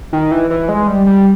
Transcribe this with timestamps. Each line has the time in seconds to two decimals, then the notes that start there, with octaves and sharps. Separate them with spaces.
0.13 D#3
0.31 E3
0.50 E3
0.69 G#3
0.87 G3
1.06 G3